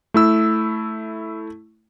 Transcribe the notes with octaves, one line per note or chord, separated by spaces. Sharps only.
A3 E4 E6